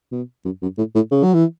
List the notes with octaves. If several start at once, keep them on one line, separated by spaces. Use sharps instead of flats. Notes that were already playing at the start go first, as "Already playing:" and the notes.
B2
F#2
F#2
A2
A2
C#3
F#3
E3